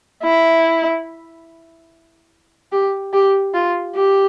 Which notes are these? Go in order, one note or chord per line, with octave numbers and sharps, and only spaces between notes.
E4
G4
G4
F4
G4